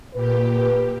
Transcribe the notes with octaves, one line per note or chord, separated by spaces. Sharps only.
A#2 G4 B4